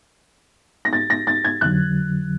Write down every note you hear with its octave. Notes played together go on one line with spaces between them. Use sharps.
A#6
A6
A#6
A6
G#6
F2 D3 F#3 F#6